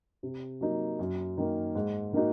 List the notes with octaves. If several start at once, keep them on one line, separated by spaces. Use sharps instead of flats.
C3
F#3 A#3 D#4
F#2
D#3 A#3
G#2
D#3 A#3 D#4 F#4